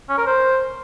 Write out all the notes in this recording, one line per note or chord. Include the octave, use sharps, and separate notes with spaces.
C#4
A#4
C5